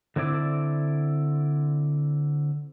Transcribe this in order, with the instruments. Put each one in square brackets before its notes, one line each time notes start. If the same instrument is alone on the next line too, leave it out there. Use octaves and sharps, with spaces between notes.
[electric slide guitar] D3 C4 E4 D5